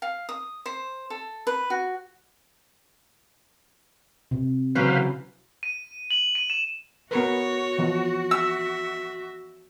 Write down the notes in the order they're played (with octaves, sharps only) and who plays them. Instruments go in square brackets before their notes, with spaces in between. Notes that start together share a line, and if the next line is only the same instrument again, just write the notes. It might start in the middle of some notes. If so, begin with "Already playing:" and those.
[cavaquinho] F5
D#6
C5
A4
B4
F#4
[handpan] C3
[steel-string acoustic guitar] C#3 E3 F#3 [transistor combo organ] B4 C5 F5
[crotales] D#7
F#7
D#7
E7
[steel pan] B3 A#4 B4 [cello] F#4 [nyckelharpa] C#5
[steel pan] E3 F3 B3
[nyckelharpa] E5 [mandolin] E6